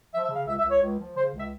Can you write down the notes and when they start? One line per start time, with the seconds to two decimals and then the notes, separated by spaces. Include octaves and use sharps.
0.13 F3 E5
0.24 E5
0.29 C#3
0.35 F5
0.47 C#2 E5
0.59 E5
0.64 C#2
0.70 C#5
0.81 C#2
0.98 F3
1.16 C#3 C5
1.33 C#2
1.38 E5